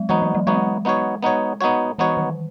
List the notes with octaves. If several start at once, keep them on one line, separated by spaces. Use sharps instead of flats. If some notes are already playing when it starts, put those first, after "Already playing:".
Already playing: F#3 G#3
E3 B3 D#4 F#4 C#5
F#3
F#3
G#3 B3 D#4 F#4 C#5
B3 D#4 F#4 C#5
B3 D#4 F#4 C#5
B3 D#4 F#4 C#5
E3 B3 D#4 F#4 C#5
D#3